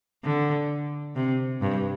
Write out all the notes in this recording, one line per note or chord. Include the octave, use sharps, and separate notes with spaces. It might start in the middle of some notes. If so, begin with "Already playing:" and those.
D3
C3
G2